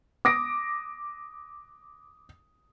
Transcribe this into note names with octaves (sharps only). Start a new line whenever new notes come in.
D6 D#6 A#6 D7